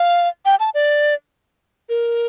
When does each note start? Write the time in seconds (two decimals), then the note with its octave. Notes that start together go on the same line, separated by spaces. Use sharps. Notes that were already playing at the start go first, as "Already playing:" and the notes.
Already playing: F5
0.46 G5
0.60 A5
0.74 D5
1.89 A#4